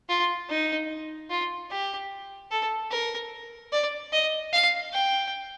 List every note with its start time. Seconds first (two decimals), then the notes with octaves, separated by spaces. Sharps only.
0.09 F4
0.49 D#4
1.30 F4
1.70 G4
2.51 A4
2.91 A#4
3.72 D5
4.12 D#5
4.53 F5
4.93 G5